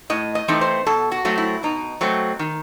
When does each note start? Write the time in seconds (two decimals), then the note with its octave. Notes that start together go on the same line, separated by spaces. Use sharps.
0.10 A2 D#5
0.35 D#5
0.48 E3 A3 C4 D#4
0.61 C5
0.87 B2 A4
1.12 F#4
1.25 F#3 A3 C4
1.38 E4
1.63 B2 D#4
2.01 F#3 A3 C4
2.39 D#3